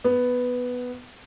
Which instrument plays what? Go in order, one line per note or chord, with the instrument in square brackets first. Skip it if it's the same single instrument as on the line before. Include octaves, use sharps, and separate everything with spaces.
[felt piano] B3